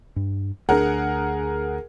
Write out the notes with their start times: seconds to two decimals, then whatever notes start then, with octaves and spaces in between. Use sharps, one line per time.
0.16 G2
0.69 D2 D4 G#4 A#4 F#5